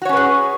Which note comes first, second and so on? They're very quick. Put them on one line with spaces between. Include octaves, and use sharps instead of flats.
F#4 C#5 C#4 B4 G#4